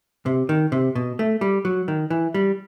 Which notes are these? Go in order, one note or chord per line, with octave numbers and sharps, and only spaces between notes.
C3
D#3
C3
B2
A3
G3
F#3
D#3
E3
G3